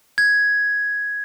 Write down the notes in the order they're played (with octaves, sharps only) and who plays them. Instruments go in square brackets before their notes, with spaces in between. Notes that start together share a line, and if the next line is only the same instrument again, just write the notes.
[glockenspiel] G#6